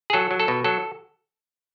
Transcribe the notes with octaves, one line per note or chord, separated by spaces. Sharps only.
G#4
F#3 A4
F#3
A4
B2
F#3 A4